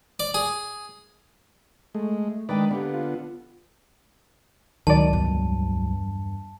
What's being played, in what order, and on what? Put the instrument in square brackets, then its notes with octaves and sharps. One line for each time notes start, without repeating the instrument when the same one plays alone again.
[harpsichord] D5
G#4
[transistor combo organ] G#3 [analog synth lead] A3
[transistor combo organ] D#3 B4 D5 [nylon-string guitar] G#3 D4 G5 [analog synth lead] D#6
[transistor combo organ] D3 B3 [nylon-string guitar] A#3 G4 [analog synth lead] B4
[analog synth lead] F4
[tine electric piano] C#2 F#3 [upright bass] A2 [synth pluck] D#3 D5 [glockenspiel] A5
[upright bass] E2 G2